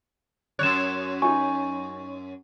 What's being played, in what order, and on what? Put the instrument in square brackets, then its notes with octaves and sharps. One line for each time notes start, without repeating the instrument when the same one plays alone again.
[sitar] F#2 G3 C#5 [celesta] F#6 E7
[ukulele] D#4 F#4 G#5 [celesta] C#6